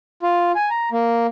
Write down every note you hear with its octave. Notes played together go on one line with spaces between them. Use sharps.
F4
G#5
A#5
A#3